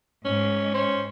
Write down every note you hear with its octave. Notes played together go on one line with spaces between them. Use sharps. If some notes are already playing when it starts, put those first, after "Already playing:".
G#2 C#4
C#4 C5